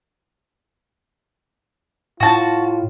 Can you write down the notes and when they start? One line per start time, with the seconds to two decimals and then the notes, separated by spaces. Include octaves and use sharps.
2.20 A2 F4 F#4 A5